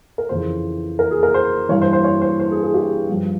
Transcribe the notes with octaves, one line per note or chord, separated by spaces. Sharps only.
A#4
F2 C#3 E3 C5
A#4
G#4
A#4
C5
G2 E3 C#5
C5
C5
C#5
C5
C5
G#4
G#4
G4
G2 F3